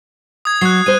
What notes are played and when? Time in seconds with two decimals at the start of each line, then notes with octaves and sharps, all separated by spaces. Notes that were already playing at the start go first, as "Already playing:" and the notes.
0.45 D#6 G#6
0.61 F#3 F#6 C7
0.86 G3 C5 D#7